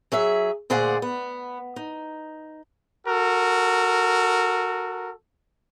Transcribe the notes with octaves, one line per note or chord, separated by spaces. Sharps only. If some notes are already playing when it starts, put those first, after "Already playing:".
F#3 G#4 E5
D2 A#2 G#4 C5 D5 F#5
B3
D#4
F#4 A4 A#4